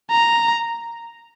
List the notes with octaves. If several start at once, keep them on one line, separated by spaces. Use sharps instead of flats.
A#5